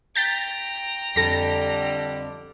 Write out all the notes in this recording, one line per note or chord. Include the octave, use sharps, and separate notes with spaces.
G5 A#5 G6 A6 B6
F2 D3 G3 A4 A#6